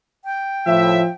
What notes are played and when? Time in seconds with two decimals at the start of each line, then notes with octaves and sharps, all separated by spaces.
0.25 G5
0.67 A2 F3 E5